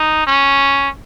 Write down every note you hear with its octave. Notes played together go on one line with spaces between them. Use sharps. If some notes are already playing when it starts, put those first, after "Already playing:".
Already playing: D#4
C#4